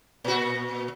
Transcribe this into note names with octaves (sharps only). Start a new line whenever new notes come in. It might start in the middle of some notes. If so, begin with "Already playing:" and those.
A#2 F#4